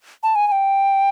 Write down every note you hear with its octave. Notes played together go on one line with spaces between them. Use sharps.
A5
G#5
G#5
G5